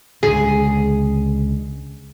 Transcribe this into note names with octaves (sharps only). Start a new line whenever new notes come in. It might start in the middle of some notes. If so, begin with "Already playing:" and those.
C#2 D3 G#4